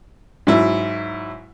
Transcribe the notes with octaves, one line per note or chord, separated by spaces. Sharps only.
G#2 F#3 E4